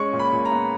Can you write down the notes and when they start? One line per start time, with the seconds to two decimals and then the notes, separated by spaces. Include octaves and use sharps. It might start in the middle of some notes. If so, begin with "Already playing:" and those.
Already playing: G#3 C#4 C#6
0.13 A#2
0.19 B5
0.32 A#2
0.45 A#5
0.52 B3